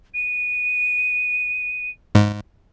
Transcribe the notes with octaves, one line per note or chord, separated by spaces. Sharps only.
D#7
G#2